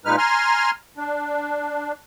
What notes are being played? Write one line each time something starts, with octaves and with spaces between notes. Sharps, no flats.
A#2 G#3 D#4 B4 F6
G#5 A#5 C6 F6
D4